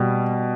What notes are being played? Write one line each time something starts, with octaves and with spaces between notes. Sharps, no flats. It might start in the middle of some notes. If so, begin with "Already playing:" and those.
Already playing: B2 G3